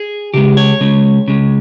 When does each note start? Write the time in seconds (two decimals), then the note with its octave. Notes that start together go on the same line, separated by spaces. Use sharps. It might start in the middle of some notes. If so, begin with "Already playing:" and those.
Already playing: G#4
0.34 C#3 G#3 G4
0.57 C#5
0.81 C#3 G#3
1.28 C#3 G#3